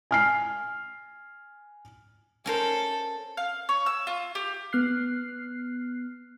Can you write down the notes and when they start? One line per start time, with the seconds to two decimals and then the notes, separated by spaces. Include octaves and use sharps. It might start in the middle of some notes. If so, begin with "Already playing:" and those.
0.11 G#5 F6 C7
2.46 C#4 A4 A#4 C5
3.37 F5
3.69 C#5
3.86 E6
4.07 F4
4.35 G4
4.73 B3 F6 F#6 C7